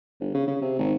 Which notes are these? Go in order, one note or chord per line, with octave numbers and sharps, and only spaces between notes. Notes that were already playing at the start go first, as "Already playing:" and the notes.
G1
C#3
C#3
C3
G#1